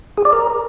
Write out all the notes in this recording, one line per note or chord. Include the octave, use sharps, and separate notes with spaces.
G#4
D5
A#4